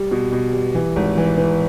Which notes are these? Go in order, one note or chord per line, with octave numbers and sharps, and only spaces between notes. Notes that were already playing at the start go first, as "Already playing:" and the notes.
Already playing: G3
B2
B2
G3
E3
G#1
E3
E3